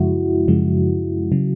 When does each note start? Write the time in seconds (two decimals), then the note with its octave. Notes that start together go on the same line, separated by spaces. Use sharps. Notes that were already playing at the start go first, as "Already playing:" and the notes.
Already playing: F#2 C#3 F3 G#3 E4 F#4
0.48 F#2 C#3 F3 G#3
1.32 C#3 F#3